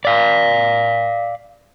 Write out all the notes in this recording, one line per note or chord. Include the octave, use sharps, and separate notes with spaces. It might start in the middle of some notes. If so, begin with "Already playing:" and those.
D5 F5